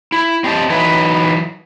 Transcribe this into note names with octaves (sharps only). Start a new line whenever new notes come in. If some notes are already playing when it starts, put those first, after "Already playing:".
E4
C4 G4 D#5 A5
E3 F#3 D#4 B4